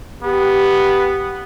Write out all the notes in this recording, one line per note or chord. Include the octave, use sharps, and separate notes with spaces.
B3 G4